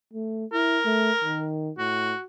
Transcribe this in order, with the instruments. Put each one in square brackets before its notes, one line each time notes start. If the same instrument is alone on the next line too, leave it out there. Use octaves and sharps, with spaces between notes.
[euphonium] A3
[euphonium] E4 [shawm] A#4
[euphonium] A3
D#3
[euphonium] A2 [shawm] F#4